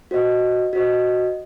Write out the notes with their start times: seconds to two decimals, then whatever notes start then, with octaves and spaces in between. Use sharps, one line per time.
0.11 F#4 C5 D#5
0.73 F#4 C5 D#5